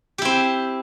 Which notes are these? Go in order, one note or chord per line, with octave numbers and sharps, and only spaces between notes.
C4 E4 G4